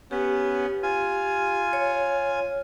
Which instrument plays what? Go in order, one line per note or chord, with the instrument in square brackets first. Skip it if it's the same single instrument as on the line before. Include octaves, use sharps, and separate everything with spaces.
[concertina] B3 C#4 [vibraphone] G4
[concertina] F4 G#5
[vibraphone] C#5